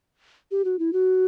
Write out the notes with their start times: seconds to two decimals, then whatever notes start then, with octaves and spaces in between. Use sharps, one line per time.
0.51 G4
0.65 F#4
0.79 E4
0.93 F#4